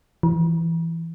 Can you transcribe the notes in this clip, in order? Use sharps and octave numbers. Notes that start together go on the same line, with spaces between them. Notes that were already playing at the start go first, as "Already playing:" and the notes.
E3